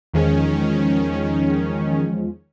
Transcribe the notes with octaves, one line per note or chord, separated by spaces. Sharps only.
E2 D#3 F3 G#3 C#4